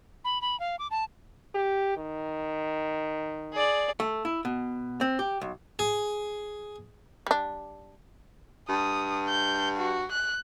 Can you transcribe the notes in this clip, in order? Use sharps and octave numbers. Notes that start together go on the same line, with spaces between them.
B5
B5
F5
D6
A5
G4
D#3
G#4 D5
A3
E4
B2
C4
G4
B1
G#4
G3 D4
G2 D#6
G6
F#4
F#6